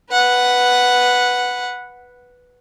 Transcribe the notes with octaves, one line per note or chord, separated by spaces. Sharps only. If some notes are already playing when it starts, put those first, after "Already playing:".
B4 F#5